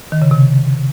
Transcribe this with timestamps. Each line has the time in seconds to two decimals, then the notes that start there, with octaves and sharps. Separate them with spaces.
0.12 D#3
0.22 C#3
0.31 C3